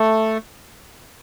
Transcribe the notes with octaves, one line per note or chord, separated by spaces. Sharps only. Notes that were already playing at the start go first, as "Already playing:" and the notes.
Already playing: A3